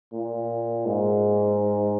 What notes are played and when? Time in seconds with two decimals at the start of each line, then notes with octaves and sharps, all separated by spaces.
0.13 A#2
0.86 G#2